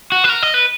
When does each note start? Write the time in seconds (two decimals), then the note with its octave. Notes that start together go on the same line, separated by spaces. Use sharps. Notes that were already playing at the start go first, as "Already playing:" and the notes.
0.12 F#4
0.24 B4
0.30 A#4
0.43 D#5
0.54 B4